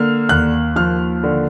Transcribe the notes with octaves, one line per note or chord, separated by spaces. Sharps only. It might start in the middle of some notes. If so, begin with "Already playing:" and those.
Already playing: D3 A#3 F6
D#2 F#6
F3 F6
D3